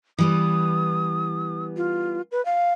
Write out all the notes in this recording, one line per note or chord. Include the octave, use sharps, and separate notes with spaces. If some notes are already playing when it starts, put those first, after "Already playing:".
E3 G3 B3 D#6
F4
B4
F5